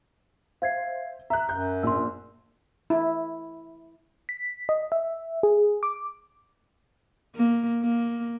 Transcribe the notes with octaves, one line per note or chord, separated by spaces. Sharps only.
C5 E5 F5 G#6 C7
E5 A#5 F#6
F#2 G6
A#1 C6 E6
E4
B6
D#5
E5
G#4
D6
A#3
A#3